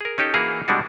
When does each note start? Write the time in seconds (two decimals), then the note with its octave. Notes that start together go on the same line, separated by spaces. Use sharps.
0.01 G#4 A#4
0.18 C#4 D#4 G4 A4
0.34 E3 A#3 E4 F#4 G#4 F5
0.68 B2 G3 G#3 D4 E4 F#4